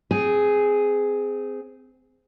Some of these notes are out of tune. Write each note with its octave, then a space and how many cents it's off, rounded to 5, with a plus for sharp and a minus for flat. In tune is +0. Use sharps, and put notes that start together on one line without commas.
C4 -20 G#4 +0